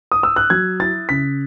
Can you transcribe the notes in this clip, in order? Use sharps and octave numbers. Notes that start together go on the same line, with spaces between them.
D#6
E6
F#6
F#3 G#6
E4 A6
C#3 B6